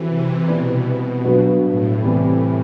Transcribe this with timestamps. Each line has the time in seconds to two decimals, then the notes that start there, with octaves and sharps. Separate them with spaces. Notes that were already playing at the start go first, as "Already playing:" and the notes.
Already playing: E3 G3 C4 F#4 A4 C5
0.09 C3
0.48 B2 G3 C4 E4 B4 D5
1.24 G2 F#3 B3 F#4 B4
1.64 A2
2.03 C3 E3 G3 C4